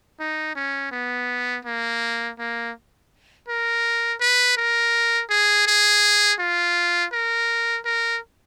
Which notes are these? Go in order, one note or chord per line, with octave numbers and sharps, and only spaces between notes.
D#4
C#4
B3
A#3
A#3
A#4
B4
A#4
G#4
G#4
F4
A#4
A#4